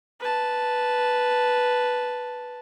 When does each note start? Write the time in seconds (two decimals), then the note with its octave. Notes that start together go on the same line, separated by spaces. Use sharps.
0.20 B4 A5